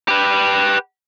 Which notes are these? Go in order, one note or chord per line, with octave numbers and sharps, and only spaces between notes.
G4 B4